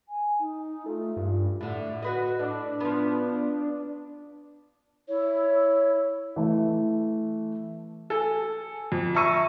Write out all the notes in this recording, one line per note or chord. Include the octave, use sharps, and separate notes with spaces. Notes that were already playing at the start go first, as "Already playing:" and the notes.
G#5
D#4
A3 F4
G2
A2 D3
F#4 B4 D#5
A2 D4
F3 B3
E4 C#5
E3 A3 E4
A4 G#5
F2
E5 A5 A#5 C#6 E6 D#7